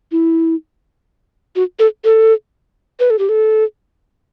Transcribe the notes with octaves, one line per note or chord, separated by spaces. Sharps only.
E4
F#4
A4
A4
B4
A4
G4
A4